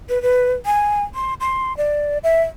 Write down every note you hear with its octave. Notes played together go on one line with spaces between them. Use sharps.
B4
B4
G#5
C6
C6
D5
E5